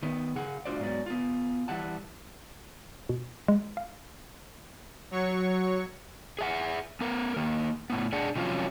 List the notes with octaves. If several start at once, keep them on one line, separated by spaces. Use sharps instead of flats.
D#3 B3
C#3 G#4 F#5
A3 D4 F4 F#4 C5 D5
G#2 F#3 B3 D5
B3 F4
E3 G3 F#5 A5
B2
G#3
F5
F#3 C#5 C#6
G#4 E5 F#5
B3 A#4
D#3 A#3
A2 B3
D4 G#4 F#5
C3 F3 F#3 C#4 F4